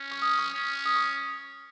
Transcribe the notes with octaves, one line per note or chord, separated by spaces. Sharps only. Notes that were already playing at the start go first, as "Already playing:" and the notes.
Already playing: C#4
C#6
D#6
C#6
C#4
D#6
C#6